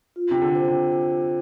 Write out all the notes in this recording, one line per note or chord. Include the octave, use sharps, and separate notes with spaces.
F4
C3
D3
C5
C3